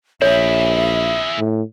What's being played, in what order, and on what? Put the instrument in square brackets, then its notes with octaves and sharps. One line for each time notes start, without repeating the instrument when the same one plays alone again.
[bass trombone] A#1 [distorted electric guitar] E4 G#4 [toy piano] C#5 [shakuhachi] E5
[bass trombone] A2